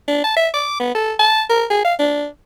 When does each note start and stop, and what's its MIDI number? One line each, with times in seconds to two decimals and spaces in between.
0.08 0.22 62
0.24 0.33 81
0.37 0.49 76
0.54 0.76 86
0.80 0.93 59
0.95 1.13 69
1.19 1.42 81
1.49 1.65 70
1.70 1.82 68
1.85 1.94 77
1.99 2.27 62